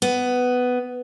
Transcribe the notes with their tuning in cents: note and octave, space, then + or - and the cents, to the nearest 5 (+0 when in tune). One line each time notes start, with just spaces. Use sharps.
B3 +10